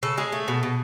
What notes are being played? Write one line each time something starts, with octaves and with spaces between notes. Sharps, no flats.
C#3 A4
G#3 G#4
A3
B2
B2